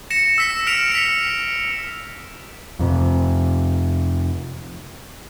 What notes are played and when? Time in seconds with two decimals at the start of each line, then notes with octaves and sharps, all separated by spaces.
0.10 A#6 C#7 E7
0.38 E6 B6 E7
0.67 F6 B6 D7 F7
0.92 B6 C#7
2.79 F2 C3